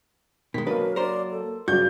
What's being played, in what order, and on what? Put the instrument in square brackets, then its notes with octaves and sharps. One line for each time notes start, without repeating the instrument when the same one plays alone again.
[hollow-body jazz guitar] B2 G#3 [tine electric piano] D#3 B6
[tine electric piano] F#3 A#3 [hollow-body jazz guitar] D4 B4 D#5 [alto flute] A#4
[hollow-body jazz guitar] A#4 C5 [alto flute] D5
[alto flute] A4
[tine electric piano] G2 C#3 [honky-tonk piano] F#3 G6 [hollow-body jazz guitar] F#4 [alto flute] D5